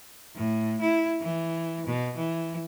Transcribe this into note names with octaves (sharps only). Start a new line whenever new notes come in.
A2
E4
E3
B2
E3